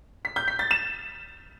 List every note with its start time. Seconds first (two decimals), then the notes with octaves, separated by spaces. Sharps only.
0.25 B6
0.36 G6
0.48 B6
0.59 A6
0.71 E7